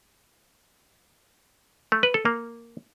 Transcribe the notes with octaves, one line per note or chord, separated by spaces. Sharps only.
A3
B4
A4
A#3